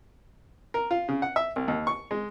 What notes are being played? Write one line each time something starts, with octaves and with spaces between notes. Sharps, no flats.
A#4
F4
C#3
F#5
E5
C2
D#2
C#6
G#3